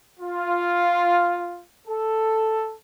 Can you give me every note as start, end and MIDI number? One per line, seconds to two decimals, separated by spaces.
0.20 1.61 65
1.87 2.73 69